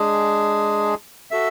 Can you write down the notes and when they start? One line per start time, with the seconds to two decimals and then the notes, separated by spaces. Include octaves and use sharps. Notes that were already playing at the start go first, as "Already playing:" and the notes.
Already playing: G#3 D4 G#4
1.31 F#4 A4 E5